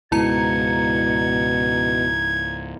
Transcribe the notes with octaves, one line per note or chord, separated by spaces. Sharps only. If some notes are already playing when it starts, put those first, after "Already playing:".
C#2 G#2 B2 E4 A#5 G#6 C#7